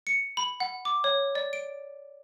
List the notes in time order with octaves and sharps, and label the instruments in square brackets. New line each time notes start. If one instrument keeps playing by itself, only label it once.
[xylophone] C#7
B5
F#5
D6
C#5
D5
D7